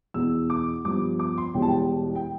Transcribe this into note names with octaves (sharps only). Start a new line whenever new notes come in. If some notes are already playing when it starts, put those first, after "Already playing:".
E2 B2 B3 E6
D6
G2 F3 B3 D6
D6
C6
E1 E2 B2 G3 G5
A5
G5
G5